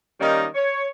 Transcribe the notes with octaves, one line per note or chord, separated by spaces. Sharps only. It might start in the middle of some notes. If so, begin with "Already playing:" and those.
D#3 G3 A#3 C#4 D#4
C#5